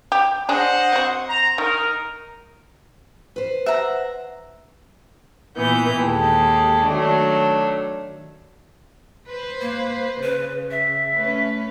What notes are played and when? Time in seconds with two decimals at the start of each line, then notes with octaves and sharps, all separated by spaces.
0.12 G4
0.49 D4 G#4 C5 D#5 F#5
0.92 C4 F#4
1.28 C5 A#5
1.58 D#3 D#4 A#4
3.36 B4 C5
3.66 E5 F#5 A#5
5.57 A#2 E3 B3 G6
6.01 D#2 G#3 G4 A4
6.87 D#3 F#3 A3 D4
9.29 B4 C5
9.61 A#3
10.23 C#3 B4
10.71 E5
11.19 A3 C#4 B4